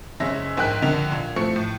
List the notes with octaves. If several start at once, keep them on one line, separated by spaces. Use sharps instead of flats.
F#1 G#3 C#4 E5 A#6
A#1 G#2 A#4 G5 F#6 B6
A#1 D3 A#4 F7
A#2
F3 A3 C4 C#6 C#7
A2